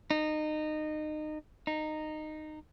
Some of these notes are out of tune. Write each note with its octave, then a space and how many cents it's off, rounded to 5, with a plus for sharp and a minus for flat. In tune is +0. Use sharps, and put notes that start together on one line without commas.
D#4 -25
D#4 -15